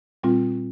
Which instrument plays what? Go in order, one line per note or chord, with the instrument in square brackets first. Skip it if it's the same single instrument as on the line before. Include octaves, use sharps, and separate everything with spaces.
[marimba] A#2 G3 C4 F4